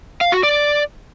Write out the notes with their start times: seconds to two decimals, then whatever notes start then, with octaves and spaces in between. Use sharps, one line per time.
0.21 F5
0.32 F#4
0.43 D5